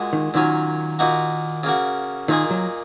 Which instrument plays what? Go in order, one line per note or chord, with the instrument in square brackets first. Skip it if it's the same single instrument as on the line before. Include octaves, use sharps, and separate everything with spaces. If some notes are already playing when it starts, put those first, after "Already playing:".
Already playing: [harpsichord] A#2 G#3 F#4
[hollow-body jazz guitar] D#3
[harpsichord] A#2 F#3 C#4 [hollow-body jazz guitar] D#3
[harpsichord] A#2 A#3 D#4 F#4
C#3 A#3 F#4
[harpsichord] A#2 A#3 D#4 G#4 [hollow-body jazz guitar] D#3
[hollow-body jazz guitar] F#3